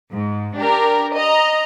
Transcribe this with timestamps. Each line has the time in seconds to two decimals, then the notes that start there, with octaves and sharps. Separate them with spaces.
0.11 G#2
0.58 D4 G4 A#4
1.15 D#5 A#5